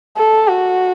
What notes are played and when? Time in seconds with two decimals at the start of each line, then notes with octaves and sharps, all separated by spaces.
0.17 A4
0.48 F#4